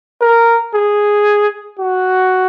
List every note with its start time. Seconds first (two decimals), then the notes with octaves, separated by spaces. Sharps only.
0.21 A#4
0.74 G#4
1.79 F#4